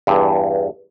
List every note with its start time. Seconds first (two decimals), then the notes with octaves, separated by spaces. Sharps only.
0.07 E2 G2